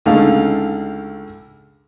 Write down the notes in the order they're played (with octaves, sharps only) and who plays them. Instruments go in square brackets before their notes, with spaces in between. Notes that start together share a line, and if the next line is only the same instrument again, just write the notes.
[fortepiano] C#2 D3 A3 D#4 F5